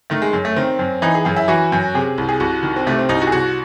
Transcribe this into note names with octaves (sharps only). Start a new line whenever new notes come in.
D#3 A3
G#3
F#2
A3
D#3 C4
F#2
E3 D#4
G#4
F#2 G#4
E4
E3 F#4
F#2
C3 G#4
C2
G#4
C2 F#4
D#3
C4
C3 A3
C4
C2 D#4
F#4
G#4
C2 F#4